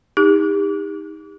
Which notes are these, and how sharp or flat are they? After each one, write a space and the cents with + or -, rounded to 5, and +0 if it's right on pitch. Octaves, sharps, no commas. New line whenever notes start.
D#4 +20 G4 +35